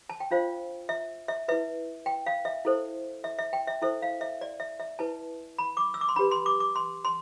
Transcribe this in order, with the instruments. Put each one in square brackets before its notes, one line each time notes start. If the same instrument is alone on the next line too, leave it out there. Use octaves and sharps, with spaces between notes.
[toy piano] A5
G5
D4 F4 C5 F5
E5
E5
E4 B4 E5
G5
F5
E5
E4 A4 C5
E5
E5
G5
E5
E4 A4 C5 E5
F5
E5
D5
E5
E5
E4 B4 A5
B5
D6
E6
D6
C6
D4 G4 B4 B5
C6
D6
D6
C6
C6